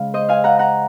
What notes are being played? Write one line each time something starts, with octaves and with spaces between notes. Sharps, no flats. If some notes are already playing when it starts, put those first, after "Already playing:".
Already playing: C#3 G#3 F5
C5 D#5
F5 G#5
F#5 A#5
F#5 A#5